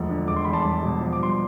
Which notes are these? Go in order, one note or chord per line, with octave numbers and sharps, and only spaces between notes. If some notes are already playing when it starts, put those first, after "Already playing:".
Already playing: E1 D2 F3
D3
E1 D6
C6
E2 B5
A5 C6
E1
B2
F3
D6
G2 C6